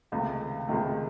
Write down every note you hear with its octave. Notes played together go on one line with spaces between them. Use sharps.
C#2 C3 D#3 A3
C#2 C3 D#3 A3